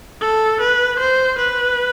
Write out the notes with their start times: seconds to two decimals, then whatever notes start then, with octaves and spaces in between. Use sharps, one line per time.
0.21 A4
0.61 B4
0.99 C5
1.38 B4